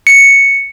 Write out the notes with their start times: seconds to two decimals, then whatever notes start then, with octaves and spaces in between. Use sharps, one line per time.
0.07 C#7